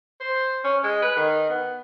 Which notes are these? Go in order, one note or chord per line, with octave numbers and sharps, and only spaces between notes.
C5
C#4
G#3
B4
D#3
B3